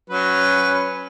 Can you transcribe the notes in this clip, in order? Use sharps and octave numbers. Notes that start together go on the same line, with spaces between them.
F#3 C#4 B4